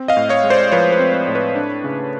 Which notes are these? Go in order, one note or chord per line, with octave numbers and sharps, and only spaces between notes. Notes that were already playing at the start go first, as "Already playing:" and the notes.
Already playing: C4
D#5 F5
A2
C#5 D#5
G#3
C5 D5
F3 B4 C#5
B4
C4
C5
A2
B4 C#5
D4
C#3